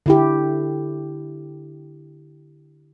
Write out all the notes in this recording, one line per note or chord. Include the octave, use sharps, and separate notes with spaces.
D3 E4 G4